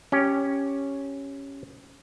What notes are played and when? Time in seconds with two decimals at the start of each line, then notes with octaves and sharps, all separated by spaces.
0.12 C#4 G4